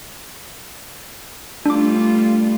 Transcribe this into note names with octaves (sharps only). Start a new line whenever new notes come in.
G3 A3 D4 F4 D6